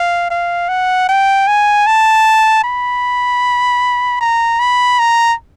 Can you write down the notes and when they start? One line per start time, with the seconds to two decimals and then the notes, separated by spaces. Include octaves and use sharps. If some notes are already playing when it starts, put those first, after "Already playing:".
Already playing: F5
0.30 F5
0.69 F#5
1.09 G5
1.48 G#5
1.86 A5
2.64 B5
4.21 A#5
4.59 B5
4.99 A#5